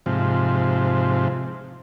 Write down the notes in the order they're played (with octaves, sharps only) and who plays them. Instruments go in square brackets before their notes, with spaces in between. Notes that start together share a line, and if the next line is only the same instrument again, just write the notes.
[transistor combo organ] G#2 C3 F3